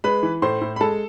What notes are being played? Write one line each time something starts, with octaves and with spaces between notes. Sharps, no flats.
G#3 B4 B5
E3
A2 C5 C6
A2
B5
G#3 A4 A5